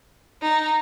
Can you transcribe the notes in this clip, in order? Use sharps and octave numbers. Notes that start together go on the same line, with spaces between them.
D#4